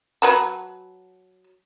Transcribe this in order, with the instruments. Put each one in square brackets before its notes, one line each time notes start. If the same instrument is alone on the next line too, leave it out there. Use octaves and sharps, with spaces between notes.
[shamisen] F#3 B4 A5